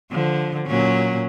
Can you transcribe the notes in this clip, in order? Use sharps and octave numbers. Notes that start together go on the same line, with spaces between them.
D3 F3
A#2 F#3 C#4